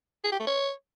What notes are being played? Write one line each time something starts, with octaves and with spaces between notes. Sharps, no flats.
G#4
G4
A3
C#5